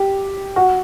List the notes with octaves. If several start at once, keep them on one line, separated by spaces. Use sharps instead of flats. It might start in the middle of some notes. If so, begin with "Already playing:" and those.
Already playing: G4
F#4